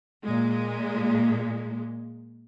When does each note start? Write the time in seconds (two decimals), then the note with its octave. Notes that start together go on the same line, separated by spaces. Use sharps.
0.25 A#2 G#3